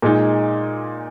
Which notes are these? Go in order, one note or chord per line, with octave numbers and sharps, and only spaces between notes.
A#2 G#3 D#4